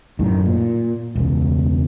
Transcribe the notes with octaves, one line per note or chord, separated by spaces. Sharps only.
F#2 A2 D#3
A#2
E1 C#2